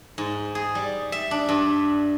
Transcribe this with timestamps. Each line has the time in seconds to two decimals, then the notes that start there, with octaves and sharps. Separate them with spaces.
0.18 G#2
0.55 G#4
0.75 G3
1.12 E5
1.31 D4
1.49 G2